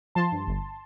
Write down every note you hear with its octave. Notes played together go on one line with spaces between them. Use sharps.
F3 A5 C6
G2
G1